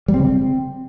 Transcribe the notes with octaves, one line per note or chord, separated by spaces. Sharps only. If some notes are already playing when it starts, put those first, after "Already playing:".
G3
C4
C#3
C4